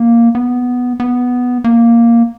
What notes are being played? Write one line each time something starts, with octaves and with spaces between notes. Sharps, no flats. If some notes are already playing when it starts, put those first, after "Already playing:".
Already playing: A#3
B3
B3
A#3